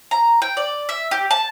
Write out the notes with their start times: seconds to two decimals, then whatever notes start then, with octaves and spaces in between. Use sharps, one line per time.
0.11 A#5
0.42 G5
0.57 D5
0.89 E5
1.11 G4
1.31 A5